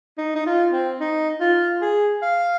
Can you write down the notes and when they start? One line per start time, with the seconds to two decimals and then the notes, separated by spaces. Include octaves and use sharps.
0.18 D#4
0.36 D#4
0.46 F4
0.73 C4
1.00 D#4
1.41 F4
1.82 G#4
2.22 F5